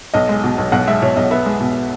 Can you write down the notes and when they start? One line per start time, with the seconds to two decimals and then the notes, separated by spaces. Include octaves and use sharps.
0.14 B1 D#5
0.29 G#3
0.44 B2
0.58 B1
0.72 B1 F#5
0.87 G#3 E5
1.02 B2 C#5
1.17 B1 D#5
1.31 B3 E5
1.46 G#3
1.60 B2